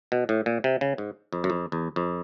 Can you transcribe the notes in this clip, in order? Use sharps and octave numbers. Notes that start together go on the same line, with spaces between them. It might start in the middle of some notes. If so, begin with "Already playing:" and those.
B2
A2
A#2
C3
C#3
G#2
F2
F#2
F2
E2
F2